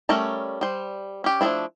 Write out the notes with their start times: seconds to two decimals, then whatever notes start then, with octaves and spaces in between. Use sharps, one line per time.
0.09 G3 A3 C#4 A#4 A5
0.61 G3 C5
1.24 C#4 G4
1.41 F3 A3 C#4 D4 E4